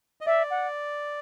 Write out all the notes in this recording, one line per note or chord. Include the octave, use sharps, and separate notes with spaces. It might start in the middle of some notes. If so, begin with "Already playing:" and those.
D#5
D5 E5
F#5